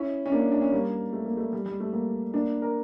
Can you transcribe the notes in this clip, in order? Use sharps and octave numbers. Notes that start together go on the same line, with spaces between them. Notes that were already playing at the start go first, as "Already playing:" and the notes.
Already playing: C#4 E4
C#4
A#3 D4
D4
C#4
G3 A#3
A3
A#3
A3
G3
G3
A3
G3 A#3
A#3 D4
A#4